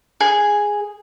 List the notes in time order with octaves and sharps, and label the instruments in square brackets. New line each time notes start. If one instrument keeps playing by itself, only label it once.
[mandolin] G#4